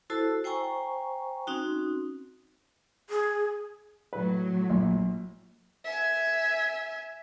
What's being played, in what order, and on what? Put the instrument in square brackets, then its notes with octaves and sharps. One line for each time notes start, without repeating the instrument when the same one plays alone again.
[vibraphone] E4 F#4 A4 C5 A5 E6
C5 G5 G#5 A#5 C#6
C4 C#4 D#4 F#4
[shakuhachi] G#4
[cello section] A2 F#3 [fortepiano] B4
[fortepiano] A#1
[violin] E5 G#5